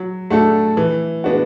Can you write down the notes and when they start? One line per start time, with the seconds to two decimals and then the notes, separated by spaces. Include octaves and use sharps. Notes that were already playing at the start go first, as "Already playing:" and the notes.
Already playing: F#3
0.30 A3 D4 F#4 A4
0.77 E3
1.24 G#3 B3 D4 F#4